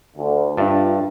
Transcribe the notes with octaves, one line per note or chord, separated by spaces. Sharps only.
D2
G2 D4 F4 E5 A6